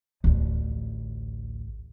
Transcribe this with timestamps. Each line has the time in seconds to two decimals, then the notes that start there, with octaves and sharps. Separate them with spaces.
0.24 A1 D2